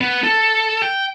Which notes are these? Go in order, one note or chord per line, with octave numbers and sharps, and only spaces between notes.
B3
A4
G5